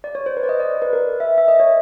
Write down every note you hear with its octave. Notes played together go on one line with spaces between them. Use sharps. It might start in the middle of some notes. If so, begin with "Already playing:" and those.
D5
C#5
C5
B4
D5
D#5
D5
B4
A#4
E5
E5
D#5
C#5